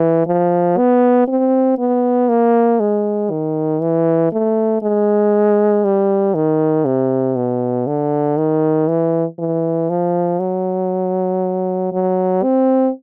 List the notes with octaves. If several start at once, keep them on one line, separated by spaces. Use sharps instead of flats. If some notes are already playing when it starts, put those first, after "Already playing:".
Already playing: E3
F3
B3
C4
B3
A#3
G#3
D#3
E3
A3
G#3
G3
D#3
C3
B2
D3
D#3
E3
E3
F3
F#3
F#3
C4